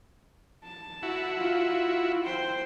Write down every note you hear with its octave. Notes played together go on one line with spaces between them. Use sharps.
A5
E4 F#4
F4
C5 G5